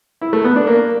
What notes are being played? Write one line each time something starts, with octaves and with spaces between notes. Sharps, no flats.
E4
A3
B3
D4
A#3